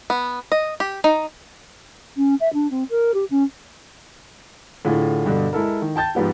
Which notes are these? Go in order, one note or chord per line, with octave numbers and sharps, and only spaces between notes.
B3
D#5
G4
D#4
C#4
E5
D4
C4
A#4
G4
C#4
A2 D3 F4 G#4
G2 B2 D3
G#3 E4 A4 A#4
D#3
G5 A5 G6 A6
G#2 F3 B3 G4